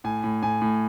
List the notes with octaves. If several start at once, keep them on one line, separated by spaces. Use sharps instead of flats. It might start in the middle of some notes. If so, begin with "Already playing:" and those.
A2 G#5
A2
A2 G#5
A2